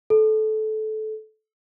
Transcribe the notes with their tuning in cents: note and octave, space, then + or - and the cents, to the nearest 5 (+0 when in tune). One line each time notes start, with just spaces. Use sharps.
A4 -20